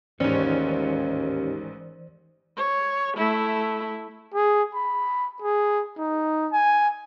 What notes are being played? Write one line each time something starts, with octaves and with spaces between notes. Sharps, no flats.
A1 D#2 G#2 E3 C#4 C5 D5
C#5
A3 E4
G#4
B5
G#4
D#4
G#5